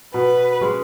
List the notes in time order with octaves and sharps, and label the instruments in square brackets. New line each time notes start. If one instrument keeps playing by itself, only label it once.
[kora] B2 [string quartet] B4
[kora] G#3 C#4